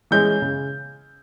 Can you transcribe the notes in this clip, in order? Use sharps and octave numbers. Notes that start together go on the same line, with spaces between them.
E3 G#3 C#4 G6
C#3